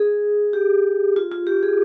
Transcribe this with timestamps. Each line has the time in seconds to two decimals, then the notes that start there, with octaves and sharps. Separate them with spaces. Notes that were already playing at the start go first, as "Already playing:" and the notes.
Already playing: G#4
0.53 G4
1.16 F4
1.32 F4
1.47 G4
1.63 G#4